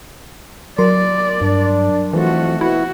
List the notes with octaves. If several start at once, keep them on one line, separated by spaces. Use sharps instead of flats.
F#3 A#4 D5 C6
G2 D4
F2 E3 A3 F#4
B2 E4 F#4